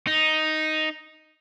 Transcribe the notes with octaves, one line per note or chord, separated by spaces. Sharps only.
D#4